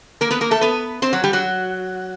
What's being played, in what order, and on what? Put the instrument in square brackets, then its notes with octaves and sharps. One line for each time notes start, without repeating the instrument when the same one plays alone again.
[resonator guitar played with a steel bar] A#3 A#4
B3 B4
A#3 A#4
A3 A4
B3 B4
C4 C5
F#3 F#4
G3 G4
F#3 F#4